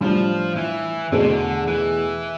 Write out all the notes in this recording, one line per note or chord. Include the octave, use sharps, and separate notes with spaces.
A2 F3 G3 D4 F4
E3
E2 B2 D3 A3
C3
D3
E3